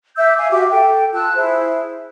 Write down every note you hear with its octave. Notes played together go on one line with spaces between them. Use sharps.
E5 D6 E6 G6
F5 G#5
F#4 G4 E5 D6
A4 G5
F4 A5 E6 F#6
E4 G#4 C5